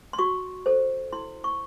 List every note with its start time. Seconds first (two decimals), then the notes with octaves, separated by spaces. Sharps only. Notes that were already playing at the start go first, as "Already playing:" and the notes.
0.13 C6
0.19 F#4 C#6
0.66 A4 C5
1.13 E4 C6
1.44 C#6